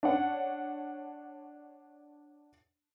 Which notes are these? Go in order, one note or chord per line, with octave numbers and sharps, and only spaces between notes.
D4 C#5 F#5